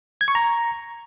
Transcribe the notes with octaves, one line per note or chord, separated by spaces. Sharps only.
G#6
C#6
A#5